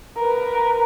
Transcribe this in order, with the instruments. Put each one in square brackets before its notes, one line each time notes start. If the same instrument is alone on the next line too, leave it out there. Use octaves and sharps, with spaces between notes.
[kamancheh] A#4 B4